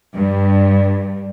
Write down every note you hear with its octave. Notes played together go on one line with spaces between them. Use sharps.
G2